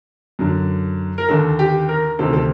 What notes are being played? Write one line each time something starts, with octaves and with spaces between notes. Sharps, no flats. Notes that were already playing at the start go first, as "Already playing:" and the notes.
F#2 D3
A#4
D#2 D3 A4
G4
A#4
D2 C3 D#3 A4
A4